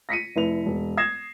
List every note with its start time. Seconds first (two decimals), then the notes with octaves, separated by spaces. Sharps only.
0.09 A#6 B6 C#7 D#7
0.36 F1 E4 B4 F7
0.66 E1
0.97 D#6 G#6 A#6 C7 E7